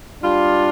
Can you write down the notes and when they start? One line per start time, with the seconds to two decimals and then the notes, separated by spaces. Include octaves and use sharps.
0.23 G3 D4 F4